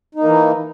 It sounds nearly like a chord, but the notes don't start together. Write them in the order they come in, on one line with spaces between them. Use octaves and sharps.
D#4 A#3 E3